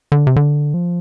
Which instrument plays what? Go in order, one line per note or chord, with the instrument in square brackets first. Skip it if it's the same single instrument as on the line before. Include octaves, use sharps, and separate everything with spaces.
[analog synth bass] D3
C3
D3
F3